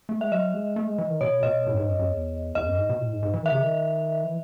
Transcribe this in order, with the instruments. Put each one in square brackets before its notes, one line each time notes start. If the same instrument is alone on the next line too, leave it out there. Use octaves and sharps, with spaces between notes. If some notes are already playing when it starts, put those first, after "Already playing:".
[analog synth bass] A3
[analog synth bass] G#3 [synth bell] E5
[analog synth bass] F#3 [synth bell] D#5
[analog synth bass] G#3
A3
G#3
E3
D#3
[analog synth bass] B2 [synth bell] C#5
[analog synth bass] B2 [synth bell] D#5
[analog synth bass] A2
F#2
G#2
F#2
F#2
E2
[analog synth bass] E2 [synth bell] D#5
[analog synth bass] F#2
G#2
B2
A2
G#2
G#2
E3
[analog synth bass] D#3 [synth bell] E5
[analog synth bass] C#3
D#3
E3